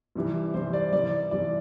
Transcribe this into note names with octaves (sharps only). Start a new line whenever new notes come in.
C2 C3 E3 G3
C2 C3 E3 G3 C5
D5
C2 C3 E3 D5
C2 C3 E3 D5